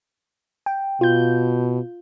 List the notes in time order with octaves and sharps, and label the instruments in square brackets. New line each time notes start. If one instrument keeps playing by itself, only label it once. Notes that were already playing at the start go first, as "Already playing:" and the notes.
[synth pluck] G5
[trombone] B2 [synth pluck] F4 G6